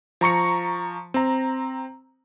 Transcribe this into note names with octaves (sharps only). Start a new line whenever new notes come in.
F3 A#5 C#6 C#7
C4 A#5